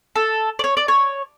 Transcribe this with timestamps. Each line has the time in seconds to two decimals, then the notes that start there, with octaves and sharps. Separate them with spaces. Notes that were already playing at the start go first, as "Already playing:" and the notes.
0.16 A4
0.59 D5
0.64 C#5
0.77 D5
0.88 C#5